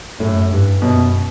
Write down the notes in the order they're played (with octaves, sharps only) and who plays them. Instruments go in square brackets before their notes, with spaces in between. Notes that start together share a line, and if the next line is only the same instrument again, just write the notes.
[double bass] F#2 [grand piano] A2
[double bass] G2
[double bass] F#2 [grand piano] B2